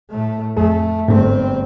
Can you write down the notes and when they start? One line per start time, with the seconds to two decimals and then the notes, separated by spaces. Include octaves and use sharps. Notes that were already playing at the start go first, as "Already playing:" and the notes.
0.10 A2 A3
0.57 F2 A3 G#4
1.08 G1 G#2 A3 C4